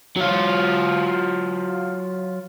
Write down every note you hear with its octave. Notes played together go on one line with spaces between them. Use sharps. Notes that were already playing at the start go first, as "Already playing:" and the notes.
F#3 F4